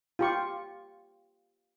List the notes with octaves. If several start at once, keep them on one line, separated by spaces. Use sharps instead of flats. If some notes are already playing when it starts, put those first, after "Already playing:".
F4 G4 C#6